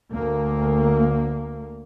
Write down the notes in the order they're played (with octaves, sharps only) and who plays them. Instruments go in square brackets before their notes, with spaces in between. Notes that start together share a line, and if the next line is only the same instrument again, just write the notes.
[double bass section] D2 A#3